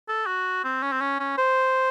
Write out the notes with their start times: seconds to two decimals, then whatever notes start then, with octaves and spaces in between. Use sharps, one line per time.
0.08 A4
0.26 F#4
0.64 C4
0.83 C#4
0.92 C4
1.01 C#4
1.20 C#4
1.38 C5